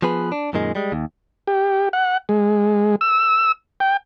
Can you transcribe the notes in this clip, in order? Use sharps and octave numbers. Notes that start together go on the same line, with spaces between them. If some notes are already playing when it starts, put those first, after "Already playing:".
F3 B3 G#4 B4
D4
F#2 A#2 D#3 G#3
G3 G#3
D#2
G4
F#5
G#3
E6
G5